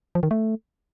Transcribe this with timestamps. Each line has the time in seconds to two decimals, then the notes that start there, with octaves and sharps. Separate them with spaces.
0.15 F3
0.23 D#3
0.31 A3